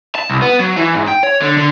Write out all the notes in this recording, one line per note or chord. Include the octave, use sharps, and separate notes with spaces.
A5
C2
B3
F#3
E3
G#2
G5
C#5
D3
D3